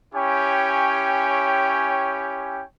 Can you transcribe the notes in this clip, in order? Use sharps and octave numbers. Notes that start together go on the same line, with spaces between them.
C#4 E4 G4 C#5 G5 G#5